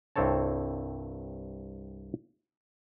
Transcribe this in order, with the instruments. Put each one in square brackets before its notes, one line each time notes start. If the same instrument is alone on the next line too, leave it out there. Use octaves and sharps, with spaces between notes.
[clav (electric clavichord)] C2 G2 C4 A4 C#5 A5